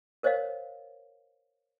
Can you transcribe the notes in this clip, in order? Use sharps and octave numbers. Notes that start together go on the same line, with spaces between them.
A#4 C5 C#5 D#5 F5